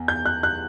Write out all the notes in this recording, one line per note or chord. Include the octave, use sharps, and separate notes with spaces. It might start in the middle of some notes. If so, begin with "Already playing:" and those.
Already playing: E2
G6
F#6
F#6